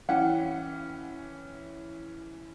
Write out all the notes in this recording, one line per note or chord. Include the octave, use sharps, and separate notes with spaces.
E3 C#4 G4 F#5